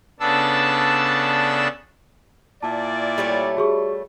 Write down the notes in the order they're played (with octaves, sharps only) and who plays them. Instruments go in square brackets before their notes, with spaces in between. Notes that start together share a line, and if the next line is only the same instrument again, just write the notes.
[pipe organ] C#3 B3 D4 A4 A5 E6
[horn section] A#2 E4 D5 [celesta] A5
[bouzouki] G3 A3 C#5
[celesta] F#4 G#4 C#6